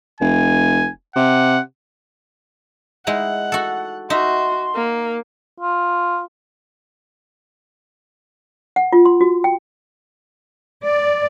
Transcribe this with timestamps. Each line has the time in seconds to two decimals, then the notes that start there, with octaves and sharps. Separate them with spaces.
0.21 F1 G#5
1.16 C3 F#5
3.07 G#3 D#4 E4 F#5
3.52 F#4 A4
4.10 D#4 F#4 E5 C6
4.75 A#3
5.60 F4
8.76 F#5
8.93 F4
9.05 C6
9.21 F#4
9.44 G5
10.83 D5